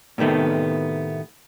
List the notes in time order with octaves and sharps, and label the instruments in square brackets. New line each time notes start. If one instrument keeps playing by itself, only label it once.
[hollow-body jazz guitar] A2 C3 D#3 A3 B3